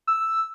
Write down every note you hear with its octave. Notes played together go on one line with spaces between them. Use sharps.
E6